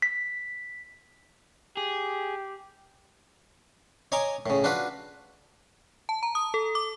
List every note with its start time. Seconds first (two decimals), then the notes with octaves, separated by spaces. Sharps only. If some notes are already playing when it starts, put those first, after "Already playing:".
0.02 B6
1.77 G4 G#4
4.12 C#5 D#5 G#5 A#5 D6
4.46 A2 C#3
4.64 D4 F4 F#4 B4
6.09 A5
6.23 A#5
6.35 D#6
6.54 A4
6.75 D6